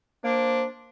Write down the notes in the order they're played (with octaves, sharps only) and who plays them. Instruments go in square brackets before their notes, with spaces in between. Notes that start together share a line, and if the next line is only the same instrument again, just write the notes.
[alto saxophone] A#3 [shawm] D4 [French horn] C5